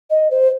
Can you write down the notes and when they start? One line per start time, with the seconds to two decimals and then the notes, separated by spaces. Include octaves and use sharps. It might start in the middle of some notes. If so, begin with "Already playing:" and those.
0.10 D#5
0.31 C5